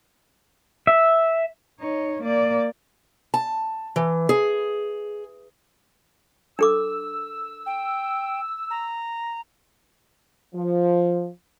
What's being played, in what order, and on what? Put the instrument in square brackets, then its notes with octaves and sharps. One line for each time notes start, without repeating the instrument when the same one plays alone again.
[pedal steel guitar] E5
[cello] D#4 C#5
A#3 D5
[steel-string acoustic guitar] A5
E3
G#4
[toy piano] D4 A4 D6 [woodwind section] E6
[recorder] G5
A#5
[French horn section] F3